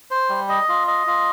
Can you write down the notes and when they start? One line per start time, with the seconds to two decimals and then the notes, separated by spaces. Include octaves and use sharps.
0.11 C5
0.30 G3
0.49 D#5
0.69 F4
0.88 D#5
1.07 F4